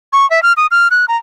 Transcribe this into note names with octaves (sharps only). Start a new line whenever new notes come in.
C#6
E5
F6
D#6
F6
F#6
A#5